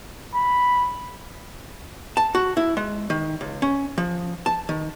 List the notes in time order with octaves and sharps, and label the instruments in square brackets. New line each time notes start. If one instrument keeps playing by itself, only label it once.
[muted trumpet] B5
[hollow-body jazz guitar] A5
F#4
E4
G#3
D#3
C#2
C#4
F3
A5
D#3